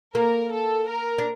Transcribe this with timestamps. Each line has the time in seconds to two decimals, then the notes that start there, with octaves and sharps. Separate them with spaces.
0.15 A#3 A#4
0.52 A4
0.88 A#4
1.18 D4